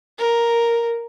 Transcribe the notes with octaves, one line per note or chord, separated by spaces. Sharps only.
A#4